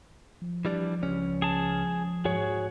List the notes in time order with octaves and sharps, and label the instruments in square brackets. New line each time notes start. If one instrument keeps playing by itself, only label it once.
[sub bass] F3
[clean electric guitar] E3 G3 D4
C#2 C#4
[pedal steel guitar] G#4 A5
[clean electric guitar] E2 G#2 [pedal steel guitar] F#4 G#4 C#5